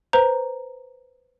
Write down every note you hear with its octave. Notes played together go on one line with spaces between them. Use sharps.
B4 C5 A#5